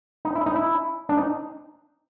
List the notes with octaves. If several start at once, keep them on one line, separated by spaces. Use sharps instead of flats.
D#4
E4
D#4
E4
D4
D#4